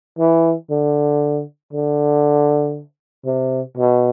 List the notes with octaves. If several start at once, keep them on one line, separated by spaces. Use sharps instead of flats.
E3
D3
D3
C3
B2